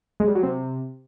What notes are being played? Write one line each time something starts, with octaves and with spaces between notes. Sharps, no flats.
G#3
G3
F#3
C3